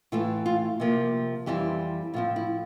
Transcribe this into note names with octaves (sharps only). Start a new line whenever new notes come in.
A2 E3 A3 F4
F4
C3 F3 A#3
F2 E3 G3 C4 E4 G4
A2 F3 C4 F4
E4